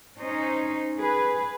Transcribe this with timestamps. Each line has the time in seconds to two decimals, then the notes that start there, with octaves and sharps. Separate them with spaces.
0.18 C#4 D#4 C5
0.97 G#4 B4